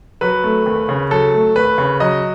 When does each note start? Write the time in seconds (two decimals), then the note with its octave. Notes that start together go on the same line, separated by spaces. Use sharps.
0.21 F#3 B4
0.44 A3
0.66 D#2
0.89 C#3
1.11 F#3 A4
1.34 A3
1.56 D#2 B4
1.78 C#3
2.00 F#3 D#5